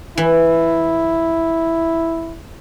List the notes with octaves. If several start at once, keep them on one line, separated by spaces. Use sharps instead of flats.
E3 E4